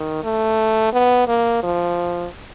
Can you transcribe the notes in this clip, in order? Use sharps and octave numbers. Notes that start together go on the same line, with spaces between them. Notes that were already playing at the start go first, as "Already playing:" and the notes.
Already playing: D#3
A3
B3
A#3
F3